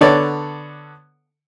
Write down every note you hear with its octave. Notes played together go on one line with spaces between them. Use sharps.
D3 B3 A4 C#5 D5